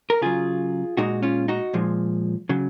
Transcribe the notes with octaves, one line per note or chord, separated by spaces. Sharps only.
A#4
C#3 F#3 F4 G#4
A#2 G#3 D#4 F#4
C#4 F4
D#4 F#4
A#2 F3 G#3
C#3 F#3